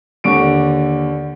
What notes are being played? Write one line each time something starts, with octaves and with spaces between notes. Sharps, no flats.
D#2 D3 C#6 D7